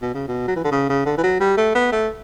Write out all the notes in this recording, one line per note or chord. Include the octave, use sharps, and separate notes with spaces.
B2
C#3
B2
F#3
E3
D3
C#3
C#3
D3
E3
F#3
G3
A3
B3
A3